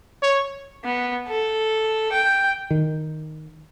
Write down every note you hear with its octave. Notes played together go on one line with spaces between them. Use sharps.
C#5
B3
A4
G5
D#3